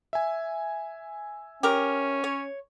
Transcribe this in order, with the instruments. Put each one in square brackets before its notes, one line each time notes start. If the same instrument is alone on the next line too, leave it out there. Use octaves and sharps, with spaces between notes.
[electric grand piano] E5 G#5
[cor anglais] C#4 [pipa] G4 A#4
[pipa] C#5